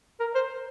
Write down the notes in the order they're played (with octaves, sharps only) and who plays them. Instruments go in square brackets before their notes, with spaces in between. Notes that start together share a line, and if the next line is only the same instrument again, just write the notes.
[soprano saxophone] A#4
C5